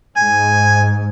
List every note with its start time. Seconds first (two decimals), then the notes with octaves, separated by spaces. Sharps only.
0.17 G#2 G#5